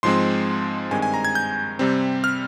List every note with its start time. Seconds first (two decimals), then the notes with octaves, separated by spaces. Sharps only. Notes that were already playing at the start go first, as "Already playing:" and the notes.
0.03 G#2 F3 G#3 C4 C6
0.91 G2 D#3 G#3 C4 G#5
1.02 G#5
1.14 A#5
1.25 G#6
1.35 G6
1.79 C3 G3 C4
2.24 F6